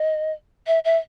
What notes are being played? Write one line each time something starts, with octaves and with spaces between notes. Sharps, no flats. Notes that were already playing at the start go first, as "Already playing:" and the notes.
Already playing: D#5
E5
E5